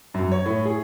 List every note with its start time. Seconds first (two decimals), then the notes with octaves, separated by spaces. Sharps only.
0.14 F#2
0.32 C#5
0.46 A2
0.65 G#4